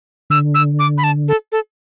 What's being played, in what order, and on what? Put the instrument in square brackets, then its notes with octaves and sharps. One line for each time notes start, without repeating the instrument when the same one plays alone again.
[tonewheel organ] D3 [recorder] E6
[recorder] E6
D6
B5
A5
A4
A4